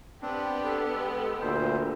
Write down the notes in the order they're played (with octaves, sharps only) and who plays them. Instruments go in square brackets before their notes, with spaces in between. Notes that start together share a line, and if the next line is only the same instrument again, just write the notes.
[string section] B3 G4 [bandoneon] C4 D4
[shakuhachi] A4
[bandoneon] G#3
[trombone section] D2 A#2 [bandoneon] C5